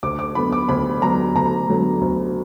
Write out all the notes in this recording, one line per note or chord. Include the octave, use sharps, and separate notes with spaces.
D2 D6
D6
D3 F#3 B3 B5
D6
D2 B5
D3 F#3 B3 A#5
D2 A#5
D3 F#3 B3
D2